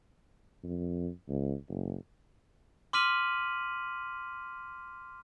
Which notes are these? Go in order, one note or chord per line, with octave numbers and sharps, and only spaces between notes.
F2
C#2
F#1
C6 D6 F6 B6 D#7 F#7